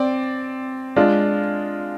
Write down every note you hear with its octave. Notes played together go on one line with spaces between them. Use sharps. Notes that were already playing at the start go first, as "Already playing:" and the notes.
Already playing: C4 D5
G#3 D4 F4